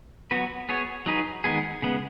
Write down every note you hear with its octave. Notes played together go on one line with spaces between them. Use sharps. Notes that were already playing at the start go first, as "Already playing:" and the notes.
F#3 B3 F#4 B4
B3 G#4 C#5
F#3 D#4 G#4 B4
D#3 G#3 B3 G#4
C#3 G#3 B3